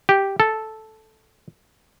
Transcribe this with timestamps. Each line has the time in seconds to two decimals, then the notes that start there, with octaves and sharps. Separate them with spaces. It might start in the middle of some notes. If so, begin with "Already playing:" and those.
0.09 G4
0.40 A4